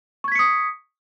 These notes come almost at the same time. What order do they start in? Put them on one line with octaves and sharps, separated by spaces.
C#6 G#6 B6 C#7 D#6